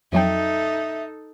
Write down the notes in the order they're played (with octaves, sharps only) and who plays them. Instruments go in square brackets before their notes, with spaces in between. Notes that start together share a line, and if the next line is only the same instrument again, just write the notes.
[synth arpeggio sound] F2 F#3 G5 [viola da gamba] D#4 A4 [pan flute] E5